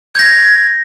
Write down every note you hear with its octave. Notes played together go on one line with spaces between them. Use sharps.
G6 G#6 A#6